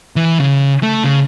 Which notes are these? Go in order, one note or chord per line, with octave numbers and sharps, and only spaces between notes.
E3
C#3
A3
C#3